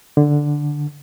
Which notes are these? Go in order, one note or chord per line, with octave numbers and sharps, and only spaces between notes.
D3